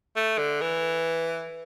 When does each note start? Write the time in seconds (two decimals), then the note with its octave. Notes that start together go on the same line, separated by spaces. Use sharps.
0.16 A3
0.38 D3
0.61 E3